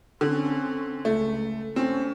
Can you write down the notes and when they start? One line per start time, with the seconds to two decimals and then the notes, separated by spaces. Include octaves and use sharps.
0.21 D3 C4 C#4
1.05 C#2 A3
1.76 A3 C4 C#4